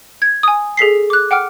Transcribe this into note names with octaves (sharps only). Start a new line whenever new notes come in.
G#6
G#5 D#6
G#4 A4 B6 C7
D6 F#6
F#5 G5 D6 F6